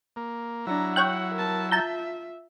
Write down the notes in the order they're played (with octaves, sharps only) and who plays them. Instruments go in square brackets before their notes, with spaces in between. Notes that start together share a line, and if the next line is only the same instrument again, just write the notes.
[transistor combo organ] A#3
[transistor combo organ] F#3 E4 [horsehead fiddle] D4 A#5
[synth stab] C#5 G5 F#6 [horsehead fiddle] F#5
[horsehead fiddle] A#4 A5
[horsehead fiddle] F4 E5 [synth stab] A5 A#5 G6